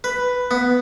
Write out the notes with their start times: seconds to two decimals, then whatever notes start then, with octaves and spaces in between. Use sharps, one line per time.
0.04 B4
0.51 B3